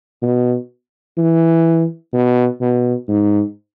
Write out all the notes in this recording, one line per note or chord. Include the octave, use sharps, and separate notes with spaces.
B2
E3
B2
B2
G#2